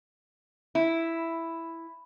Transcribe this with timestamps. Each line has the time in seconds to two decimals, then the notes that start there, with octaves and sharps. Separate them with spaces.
0.75 E4